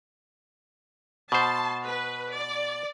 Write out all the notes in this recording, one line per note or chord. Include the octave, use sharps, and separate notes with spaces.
B2 C5 A5 C6
B4
D5